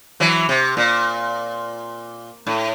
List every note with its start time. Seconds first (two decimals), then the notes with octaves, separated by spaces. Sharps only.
0.20 E3 F#3
0.49 C3
0.77 A#2
2.47 A2